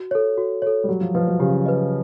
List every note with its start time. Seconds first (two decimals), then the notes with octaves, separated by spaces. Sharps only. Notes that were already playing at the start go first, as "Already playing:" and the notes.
Already playing: F#4
0.11 A4 C#5
0.37 F#4
0.62 A4 C#5
0.84 G3
0.88 F#3 G4
1.01 F3
1.14 F3 B4 D#5
1.28 F#3
1.40 C#3 G4
1.66 B4 D#5